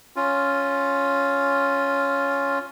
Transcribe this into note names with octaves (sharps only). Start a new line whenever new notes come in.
C#4 F4